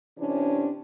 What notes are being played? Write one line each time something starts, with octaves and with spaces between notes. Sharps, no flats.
C3 E3 C#4 D4